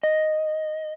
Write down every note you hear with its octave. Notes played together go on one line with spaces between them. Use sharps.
D#5